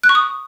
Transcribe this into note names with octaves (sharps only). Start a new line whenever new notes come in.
F#6
C#6
D#6